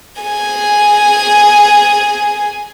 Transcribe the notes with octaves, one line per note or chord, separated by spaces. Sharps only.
G#4 G#5